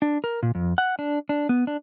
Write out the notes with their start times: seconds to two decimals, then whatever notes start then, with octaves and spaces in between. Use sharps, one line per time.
0.02 D4
0.24 A#4
0.43 A#2
0.55 F2
0.78 F#5
0.99 D4
1.29 D4
1.49 B3
1.67 D4